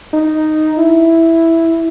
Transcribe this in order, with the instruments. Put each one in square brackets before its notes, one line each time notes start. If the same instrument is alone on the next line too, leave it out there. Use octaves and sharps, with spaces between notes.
[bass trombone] D#4
E4